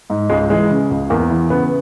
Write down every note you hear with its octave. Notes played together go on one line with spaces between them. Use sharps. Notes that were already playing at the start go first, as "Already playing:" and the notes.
G#2
C#2 G#3
E3 G#3
C#3
C#2
E2 A#3
E3
C#3 B3